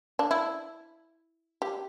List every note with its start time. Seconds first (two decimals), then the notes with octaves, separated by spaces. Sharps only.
0.19 D4
0.31 E4
1.62 G4